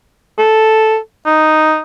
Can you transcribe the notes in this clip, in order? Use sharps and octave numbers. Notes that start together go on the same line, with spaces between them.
A4
D#4